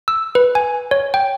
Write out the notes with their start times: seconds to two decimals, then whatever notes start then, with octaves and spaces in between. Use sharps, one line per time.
0.08 E6
0.35 B4
0.55 G#5
0.91 C#5
1.14 G5